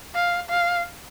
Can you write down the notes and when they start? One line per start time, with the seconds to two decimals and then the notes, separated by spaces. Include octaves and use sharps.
0.15 F5
0.50 F5